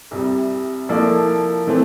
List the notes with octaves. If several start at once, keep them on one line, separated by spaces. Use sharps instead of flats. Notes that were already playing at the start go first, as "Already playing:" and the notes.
C2 C3 G3
F3 A#3 E4 A4 D5
E3 A3 C4